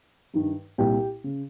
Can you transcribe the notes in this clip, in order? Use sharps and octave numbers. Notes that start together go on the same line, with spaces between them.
G2 D#3
C2 A#2 G4 G5
C#3